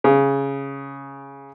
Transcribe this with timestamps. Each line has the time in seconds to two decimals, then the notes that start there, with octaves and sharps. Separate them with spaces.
0.04 C#3